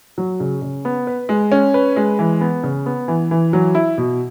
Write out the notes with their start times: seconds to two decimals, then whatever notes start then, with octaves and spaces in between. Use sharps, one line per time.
0.18 F#3
0.40 C#3
0.62 C#3
0.85 B3
1.07 B4
1.29 G#3
1.52 C#4
1.74 B4
1.96 G#3
2.19 E3
2.41 B3
2.63 C#3
2.86 B3
3.08 E3
3.31 E3
3.53 F#3
3.75 E4
3.98 B2